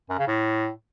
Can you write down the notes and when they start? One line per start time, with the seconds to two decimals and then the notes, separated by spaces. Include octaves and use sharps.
0.10 F#2
0.19 C#3
0.28 A2